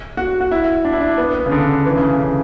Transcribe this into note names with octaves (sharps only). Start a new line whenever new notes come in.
F#4
F#4
E4
D4
E4
D4
B3
B3
C#3
D3
E3
C#3
D3
C#3